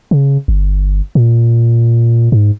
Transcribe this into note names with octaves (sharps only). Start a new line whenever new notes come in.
C#3
G1
A#2
G#2